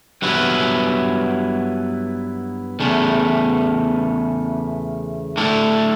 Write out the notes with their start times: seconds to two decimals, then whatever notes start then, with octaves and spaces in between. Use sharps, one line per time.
0.22 G2 F#3 B3 E4
2.80 E2 C#3 A3
5.37 D3 A3 E4 A4